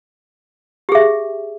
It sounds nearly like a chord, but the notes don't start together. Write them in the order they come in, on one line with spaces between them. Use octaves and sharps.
G4 G#4 E5